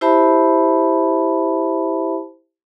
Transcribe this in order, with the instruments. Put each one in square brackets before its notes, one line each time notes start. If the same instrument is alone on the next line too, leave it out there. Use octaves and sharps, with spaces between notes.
[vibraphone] E4 G4 C5 E5 A5 B5